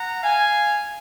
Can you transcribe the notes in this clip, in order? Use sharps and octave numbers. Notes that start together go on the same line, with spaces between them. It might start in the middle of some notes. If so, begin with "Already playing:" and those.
Already playing: F#5 A#5
F5 G#5